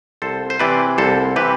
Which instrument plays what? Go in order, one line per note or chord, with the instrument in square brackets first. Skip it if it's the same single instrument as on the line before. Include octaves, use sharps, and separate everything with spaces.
[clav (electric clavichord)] C2 A4 C5
C5
C3 E3 B4 D5
C2 A4 C5
C3 E3 G4 B4